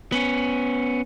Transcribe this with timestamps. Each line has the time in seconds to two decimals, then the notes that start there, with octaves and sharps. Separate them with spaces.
0.12 B3 C#4